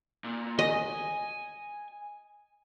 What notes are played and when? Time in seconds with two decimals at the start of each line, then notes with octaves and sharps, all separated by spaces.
0.24 A#2
0.59 D#5 G#5